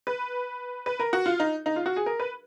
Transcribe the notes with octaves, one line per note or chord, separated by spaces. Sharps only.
B4
B4
A#4
F#4
F4
D#4
D#4
F4
F#4
G#4
A#4
B4